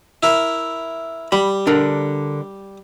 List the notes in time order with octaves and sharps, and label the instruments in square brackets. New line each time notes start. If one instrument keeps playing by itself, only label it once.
[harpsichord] E4 A#4
[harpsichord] G3 [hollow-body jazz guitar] B5
[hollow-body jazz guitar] D3 D4 A#4